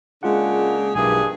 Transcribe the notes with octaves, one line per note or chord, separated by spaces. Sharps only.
C#3 G#3 A#3 D4 F4 F#5
B1 G2 A#2 E3 G#4